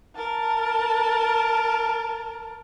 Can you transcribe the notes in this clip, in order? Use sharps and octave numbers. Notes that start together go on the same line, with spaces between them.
A#4 A5